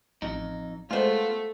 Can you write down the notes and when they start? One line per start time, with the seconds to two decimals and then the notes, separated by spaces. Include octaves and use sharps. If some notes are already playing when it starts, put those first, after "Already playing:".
0.22 A1 F2 D#4
0.91 G#3 A3 B3 F4 C5